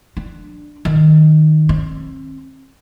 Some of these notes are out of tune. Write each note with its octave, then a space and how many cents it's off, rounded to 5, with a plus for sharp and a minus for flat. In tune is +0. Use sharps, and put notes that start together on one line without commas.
D4 +10
D#3 -5
C4 +35